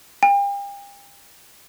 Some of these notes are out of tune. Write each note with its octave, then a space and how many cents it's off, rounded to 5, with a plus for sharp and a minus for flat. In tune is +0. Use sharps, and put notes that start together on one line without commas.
G5 +40